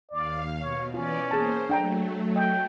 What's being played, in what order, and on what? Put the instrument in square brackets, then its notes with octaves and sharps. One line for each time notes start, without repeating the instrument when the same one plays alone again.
[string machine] D#2 F5 [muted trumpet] D5
[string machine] B2 [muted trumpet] C#5
[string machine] E3 B3 D5 [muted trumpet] C#4 [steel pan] F4
[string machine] A#3 C5 [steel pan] G#4 A5
[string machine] F#3 A3 [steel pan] D4 G5 A#5
[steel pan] D#5 [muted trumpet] G5